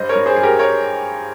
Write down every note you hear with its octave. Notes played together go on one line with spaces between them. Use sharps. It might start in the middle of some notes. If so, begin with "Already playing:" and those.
Already playing: G2 C5 D#5
A#4 C#5
G2
G#4 C5
G2 G#4
G4 A#4
A#4 C#5